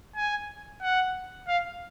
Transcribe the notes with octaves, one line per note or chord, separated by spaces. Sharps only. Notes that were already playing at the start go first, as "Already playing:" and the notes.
G#5
F#5
F5